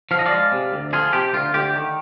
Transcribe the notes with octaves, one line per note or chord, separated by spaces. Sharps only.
F3 F5
D#5
D5 F5
G#3
C3
D2
F3 F4 G#4
C3 G4
D2 F4
D2 G4
D#3